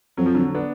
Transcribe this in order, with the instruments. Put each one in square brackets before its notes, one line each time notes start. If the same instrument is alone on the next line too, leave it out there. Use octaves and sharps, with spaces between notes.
[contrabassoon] F2 [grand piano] F#3
[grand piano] F3
D3 F#3
B3 D4